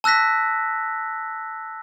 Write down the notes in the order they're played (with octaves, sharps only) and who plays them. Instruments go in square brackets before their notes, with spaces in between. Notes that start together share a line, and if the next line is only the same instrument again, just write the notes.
[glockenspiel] A5 E6 F#6 A#6 B6